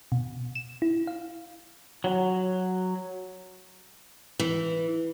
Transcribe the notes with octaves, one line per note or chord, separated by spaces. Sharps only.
B2
E7
E4
F5
F#3
E3